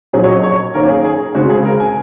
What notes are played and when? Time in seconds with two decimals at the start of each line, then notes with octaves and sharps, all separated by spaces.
0.13 A#2 F#3 C#4 G#4
0.23 C#5
0.28 D#5
0.43 C#5
0.74 D#3 A#3 C#4 A#4
0.89 G#4
1.04 G#4
1.35 C#3 G#3 C4 F#4
1.49 G#4
1.65 A#4
1.80 G#5